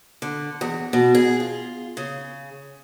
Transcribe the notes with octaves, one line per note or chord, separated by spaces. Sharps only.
D3
E2
B2
G#4
F4
C#3